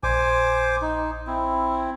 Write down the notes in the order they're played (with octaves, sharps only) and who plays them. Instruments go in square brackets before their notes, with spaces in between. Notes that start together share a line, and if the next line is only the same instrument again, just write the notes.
[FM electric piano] A#1 [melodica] C5 G#5 D6
[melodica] D#4
C4 E4